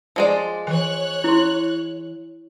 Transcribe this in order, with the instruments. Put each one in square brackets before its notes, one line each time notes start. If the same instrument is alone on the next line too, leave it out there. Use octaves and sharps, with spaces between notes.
[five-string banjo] F3 G#3 D5
[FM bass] E3 [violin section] C#5 F#6
[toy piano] E4 C6